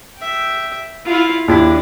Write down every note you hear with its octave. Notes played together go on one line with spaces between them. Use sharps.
E5 G5
E4 F4
D#2 D4 E4 B5